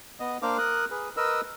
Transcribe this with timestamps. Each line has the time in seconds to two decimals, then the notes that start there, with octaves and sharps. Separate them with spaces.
0.20 B3 D#5
0.42 A#3 D4 C5 F5 D6
0.58 A#4 D#6 F#6
0.91 G#4 B4
1.17 A#4 B4 D#5 E6